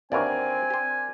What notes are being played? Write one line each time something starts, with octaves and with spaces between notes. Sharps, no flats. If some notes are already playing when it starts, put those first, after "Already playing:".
D#2 E3 C4 D4 F#4 A#4 D5 G#5
G4 C5